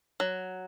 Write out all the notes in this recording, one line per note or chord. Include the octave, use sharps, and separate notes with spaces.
F#3